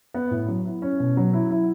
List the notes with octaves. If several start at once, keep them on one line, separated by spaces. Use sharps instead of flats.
B3
A2
F#3
E4
C#4
B2
F#3
E4
E4